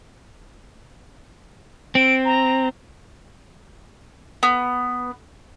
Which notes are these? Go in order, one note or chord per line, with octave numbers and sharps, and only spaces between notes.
C4 D7
A#5
B3